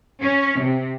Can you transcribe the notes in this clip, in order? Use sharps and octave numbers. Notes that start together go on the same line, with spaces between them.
C#4
C3